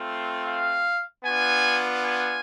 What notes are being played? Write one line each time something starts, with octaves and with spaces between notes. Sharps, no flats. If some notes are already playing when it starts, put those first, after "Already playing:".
Already playing: A3 C4 F4
F5
B3 D4 F4 G#5
G#5